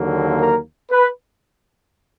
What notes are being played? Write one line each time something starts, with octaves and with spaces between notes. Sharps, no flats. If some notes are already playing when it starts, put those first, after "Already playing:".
Already playing: D#2 D3 F#3 A#3
A#4
B4